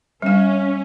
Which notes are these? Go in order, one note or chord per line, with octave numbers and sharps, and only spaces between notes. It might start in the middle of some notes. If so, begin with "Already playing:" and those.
G3 C#4 F5